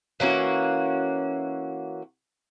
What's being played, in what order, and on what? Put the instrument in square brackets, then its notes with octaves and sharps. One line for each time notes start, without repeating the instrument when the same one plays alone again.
[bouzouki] E3 A#3 C#4 F#4